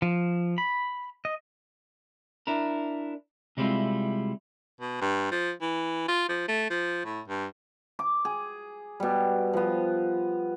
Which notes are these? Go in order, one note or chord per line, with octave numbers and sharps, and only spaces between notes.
F3
B5
D#5
D4 E4 A#4
C3 G3 G#3 C4 E4 F4
B2
G2
F3
E3
F4
F3
A3
F3
A2
G2
D6
G#4
B2 G3
F3 B3